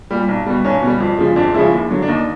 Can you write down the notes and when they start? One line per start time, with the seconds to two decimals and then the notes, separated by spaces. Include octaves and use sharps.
0.11 A#2 G3
0.28 B1
0.46 B2 G3
0.65 B1 C#4
0.82 B2 G3
1.00 F2
1.18 C#3 F3 G#3
1.36 F2 D4
1.54 C#3 F3 G#3 E4
1.72 D#2
1.90 D3 F#3
2.02 D4
2.08 D#2 D#4